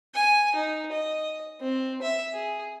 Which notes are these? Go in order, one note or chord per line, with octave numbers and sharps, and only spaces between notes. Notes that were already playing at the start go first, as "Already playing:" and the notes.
G#5
D#4
D#5
C4
E5
G#4